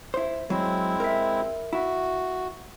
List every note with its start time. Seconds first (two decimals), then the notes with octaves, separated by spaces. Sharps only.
0.14 E4 C5
0.50 F#3 G#3 C4 E4
1.00 A#4 E5
1.73 E4 F#4